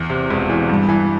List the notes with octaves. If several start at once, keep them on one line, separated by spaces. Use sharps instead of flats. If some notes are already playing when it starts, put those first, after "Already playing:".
Already playing: E2
C3
E1
E3
G2
E3